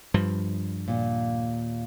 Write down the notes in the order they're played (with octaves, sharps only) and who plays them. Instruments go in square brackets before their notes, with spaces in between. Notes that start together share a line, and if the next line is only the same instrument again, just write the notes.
[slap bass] G2 F3
[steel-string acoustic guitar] D#2 A#2